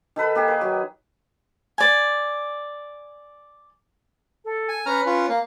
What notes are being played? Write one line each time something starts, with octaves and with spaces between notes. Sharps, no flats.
D#3 A4 B4 B5
A#3 G4 G#4
B4
F#3
D5 G#5
A4
G#5
C#4 B4 A#5 F6
C#4 F4
A#3 F5